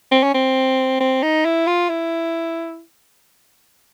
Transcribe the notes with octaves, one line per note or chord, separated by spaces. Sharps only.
C4
C#4
C4
C4
D#4
E4
F4
E4